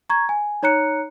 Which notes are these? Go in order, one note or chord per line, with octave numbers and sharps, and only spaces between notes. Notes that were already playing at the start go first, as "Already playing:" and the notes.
A#5 C#6 G#6
G#5
D#4 C#5 A#5 F#6 C#7